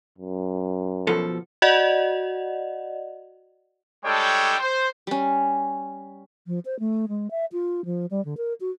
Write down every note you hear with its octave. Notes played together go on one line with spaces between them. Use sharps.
F#2
B2 F3 A4
F#4 D5 D#5 F#5
G3 G#3 D4 A4 C#5 G5
C5
G3 C#4
F3
C5
A3
G#3
E5
F4
F3
G3
D3
A#4
F#4